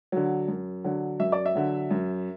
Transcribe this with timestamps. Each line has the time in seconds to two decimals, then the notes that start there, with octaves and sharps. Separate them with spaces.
0.12 D3 F#3
0.48 F#2
0.84 D3 F#3
1.20 F#2 E5
1.32 D5
1.46 E5
1.55 D3 F#3
1.91 F#2